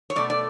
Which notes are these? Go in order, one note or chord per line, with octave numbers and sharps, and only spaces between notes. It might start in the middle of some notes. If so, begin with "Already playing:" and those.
C#5
B2 A3 D5
D5